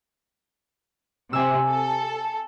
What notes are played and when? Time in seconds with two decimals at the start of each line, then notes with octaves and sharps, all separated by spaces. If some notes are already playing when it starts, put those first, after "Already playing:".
1.33 C3 G#5 D6 E6
1.68 A4